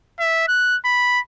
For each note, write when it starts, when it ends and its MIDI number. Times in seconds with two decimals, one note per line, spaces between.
0.19 0.46 76
0.48 0.76 90
0.85 1.19 83